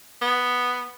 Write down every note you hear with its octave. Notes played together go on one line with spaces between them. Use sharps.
B3